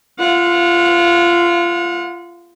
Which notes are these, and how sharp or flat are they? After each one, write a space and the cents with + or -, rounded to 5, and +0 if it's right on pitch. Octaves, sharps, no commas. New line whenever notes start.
F4 -20 F#5 -35